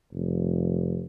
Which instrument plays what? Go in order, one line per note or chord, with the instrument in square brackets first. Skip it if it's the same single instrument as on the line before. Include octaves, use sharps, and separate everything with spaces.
[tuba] F1